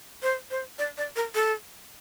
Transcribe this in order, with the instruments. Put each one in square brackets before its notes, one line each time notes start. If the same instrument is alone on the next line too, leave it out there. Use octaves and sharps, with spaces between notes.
[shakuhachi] C5
C5
D5
D5
A#4
A4